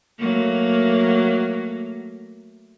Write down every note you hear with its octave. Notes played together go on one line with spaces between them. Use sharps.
F#3 A3 A#3